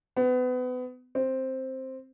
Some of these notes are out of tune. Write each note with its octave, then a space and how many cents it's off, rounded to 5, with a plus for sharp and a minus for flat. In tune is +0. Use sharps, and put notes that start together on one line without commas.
B3 +30
C4 +5